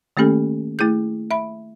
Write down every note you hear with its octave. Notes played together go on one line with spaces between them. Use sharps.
D#3 A3 A#3 C#4 G4 A4
A3 E4 G#4 G6
E5 B5